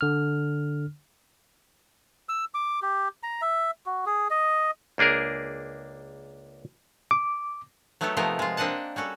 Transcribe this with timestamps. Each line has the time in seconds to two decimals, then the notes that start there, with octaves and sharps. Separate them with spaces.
0.01 D3 F6
2.29 E6
2.54 D6
2.82 G4
3.23 A#5
3.42 E5
3.86 F#4
4.06 G#4
4.30 D#5
4.98 C#2 A#3 D4 G#4 A#4
7.11 D6
8.01 F#3 A3 B3 D#4 G4 A4
8.17 C3 F3 A3 B3 D#4 A#4
8.39 G#3 F4
8.57 A#3 C4 D4 D#5 F#5 A5
8.96 G3 C#4 F#4 A4